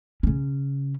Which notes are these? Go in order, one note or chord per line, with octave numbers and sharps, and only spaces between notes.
C#3 C#4